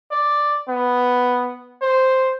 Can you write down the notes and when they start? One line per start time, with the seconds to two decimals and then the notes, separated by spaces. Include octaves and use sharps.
0.11 D5
0.68 B3
1.82 C5